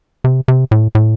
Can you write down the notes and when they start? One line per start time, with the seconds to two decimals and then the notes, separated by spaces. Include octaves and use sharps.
0.24 C3
0.48 C3
0.71 A2
0.95 A2